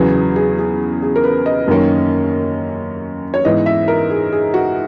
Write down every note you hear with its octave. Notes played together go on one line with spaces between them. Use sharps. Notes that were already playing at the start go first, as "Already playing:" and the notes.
Already playing: E2 C#3 F#3 B3 G#4
G#4
G#4
G#4
A#4
B4
D#5
F#2 D#3 A#3 C#4
C#5
G#2 E3 B3 D#5
E5
A#4
G#4
G#4
F#4